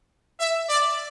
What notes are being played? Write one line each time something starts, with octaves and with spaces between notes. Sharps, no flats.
E5
D5